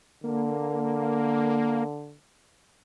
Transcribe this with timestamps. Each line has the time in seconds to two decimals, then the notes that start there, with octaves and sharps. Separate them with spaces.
0.24 D3 A#3